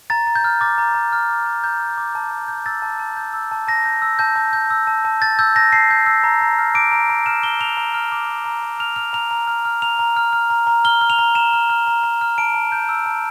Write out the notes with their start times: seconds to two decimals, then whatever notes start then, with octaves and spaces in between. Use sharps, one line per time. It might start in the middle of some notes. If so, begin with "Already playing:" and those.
0.10 A#5 A6
0.27 A#5
0.35 G6
0.44 F6
0.61 D6 A6
0.78 A#5
0.95 A#5
1.13 F6
1.30 D6
1.46 A#5
1.64 A#5 G6
1.80 F6
1.98 D6
2.15 A5
2.31 A5
2.48 G6
2.66 E6 A6
2.82 A5
2.99 A5
3.17 G6
3.34 E6
3.51 A5
3.68 A5 A#6
3.85 G6
4.02 E6
4.19 A5 G6
4.36 A5
4.53 G6
4.70 E6
4.87 A5
5.05 A5
5.21 G6 A6
5.39 E6 G6
5.56 A5 A#6
5.73 A5 C7
5.90 G6
6.06 E6
6.24 A#5
6.41 A#5
6.58 F6
6.75 D6 D7
6.92 A#5
7.10 A#5
7.26 F6 E7
7.43 D6 G7
7.60 A#5 F7
7.77 A#5
7.94 F6
8.12 D6
8.29 F6
8.46 A#5
8.62 A#5
8.80 F6 F7
8.96 F6 F7
9.13 A#5 F7
9.31 A#5
9.47 F6
9.65 F6
9.82 A#5 F7
9.99 A#5
10.16 F6
10.33 F6
10.50 A#5
10.67 A#5
10.84 F6 G7
11.01 F6
11.10 F7
11.19 A#5
11.35 A#5 E7
11.53 F6
11.70 F6
11.87 A#5
12.04 A#5
12.21 F6
12.38 A5 D7
12.55 A5
12.72 G6
12.89 E6
13.06 A5